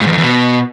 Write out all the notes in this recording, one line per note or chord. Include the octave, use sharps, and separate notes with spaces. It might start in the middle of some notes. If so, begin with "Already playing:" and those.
G#2
E2
F2
E2
B2